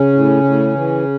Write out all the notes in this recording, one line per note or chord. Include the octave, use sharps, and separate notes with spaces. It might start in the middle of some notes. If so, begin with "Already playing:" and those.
Already playing: C#3 C#4
A2
A2
E3